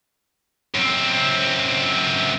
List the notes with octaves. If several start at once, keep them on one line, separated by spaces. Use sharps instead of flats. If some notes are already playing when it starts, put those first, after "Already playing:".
F#2 C4